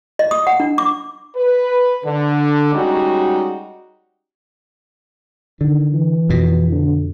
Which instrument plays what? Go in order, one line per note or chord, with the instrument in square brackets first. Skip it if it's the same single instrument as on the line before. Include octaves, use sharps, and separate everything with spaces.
[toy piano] D#5
D#6
F#5
D4
D6
[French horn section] B4
D3
G3 G#3 C#4 D#4 F#4
[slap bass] D3 [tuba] D#3
[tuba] E3
[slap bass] F2 B2
[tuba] D3